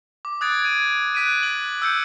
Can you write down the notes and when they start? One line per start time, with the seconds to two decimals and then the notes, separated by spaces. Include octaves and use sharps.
0.25 D6
0.41 D#6 F#6 G#6 A6 D7
0.64 G#6 D7 D#7
1.15 F#6 G#6 B6 D7 D#7
1.43 F#7
1.82 E6 G6 C#7